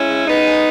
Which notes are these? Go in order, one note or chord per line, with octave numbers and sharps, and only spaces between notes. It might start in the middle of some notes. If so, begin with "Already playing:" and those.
Already playing: G#3 C#4 E4
C#3
C#3 B3 D#4
G#3